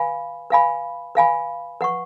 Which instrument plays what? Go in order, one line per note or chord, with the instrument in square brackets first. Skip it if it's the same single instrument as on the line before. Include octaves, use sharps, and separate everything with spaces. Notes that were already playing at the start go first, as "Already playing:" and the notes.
Already playing: [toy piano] B4 F5 G#5 B5
B4 F5 G#5 B5
B4 F5 G#5 B5
B4 F#5 C#6